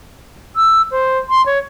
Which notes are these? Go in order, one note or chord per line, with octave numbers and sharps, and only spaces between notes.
E6
C5
C6
C#5